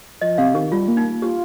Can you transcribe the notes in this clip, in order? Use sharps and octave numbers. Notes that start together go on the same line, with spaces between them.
F3 D#5
C3 F5
D#3 G4
G3 F4
A#3
D#4
F4 G4